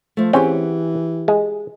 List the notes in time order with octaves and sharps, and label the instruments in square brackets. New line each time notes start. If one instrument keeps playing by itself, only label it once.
[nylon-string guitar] F3 A3
[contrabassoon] E3 [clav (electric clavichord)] C4 C#4 [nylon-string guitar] G4 G#4 F#5
[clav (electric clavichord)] G#3